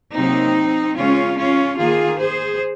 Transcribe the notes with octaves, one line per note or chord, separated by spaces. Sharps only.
C3 F#3 A#3 C4 D#4
C#3 G#3 C#4 F4
C#4 F4
D#3 A#3 F4 G#4
G#4 C5